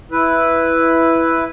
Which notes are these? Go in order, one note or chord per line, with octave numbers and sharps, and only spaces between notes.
E4 B4